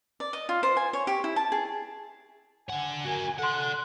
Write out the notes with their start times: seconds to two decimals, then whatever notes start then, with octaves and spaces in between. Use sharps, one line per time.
0.20 D5
0.33 D#5
0.49 F4
0.63 C5
0.77 G#5
0.93 C#5
1.07 G4
1.24 E4
1.36 A5
1.52 G#4
2.70 D3 F#5 G#5
3.06 F#4 A#4
3.39 A4 D5 F#5 C6 F#6